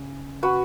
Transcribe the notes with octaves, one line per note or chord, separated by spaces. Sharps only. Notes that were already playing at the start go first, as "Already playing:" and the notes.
Already playing: C#3
F#4 B4